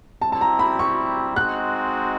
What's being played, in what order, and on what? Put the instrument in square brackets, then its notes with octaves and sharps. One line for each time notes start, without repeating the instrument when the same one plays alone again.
[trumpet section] G3 C4 E4 [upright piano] A5
[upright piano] A5
A#5
B5
C#6
[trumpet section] G#3 C4 D#4 F#4 [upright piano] F#6